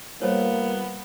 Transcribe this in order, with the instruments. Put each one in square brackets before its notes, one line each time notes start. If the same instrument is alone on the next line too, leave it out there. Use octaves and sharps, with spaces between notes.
[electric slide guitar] G3 F4 [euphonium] A#3 [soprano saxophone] B3 [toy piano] C5 C#5